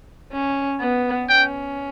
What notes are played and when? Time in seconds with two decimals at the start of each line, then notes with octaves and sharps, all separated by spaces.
0.32 C#4
0.80 B3
1.29 C#4 G5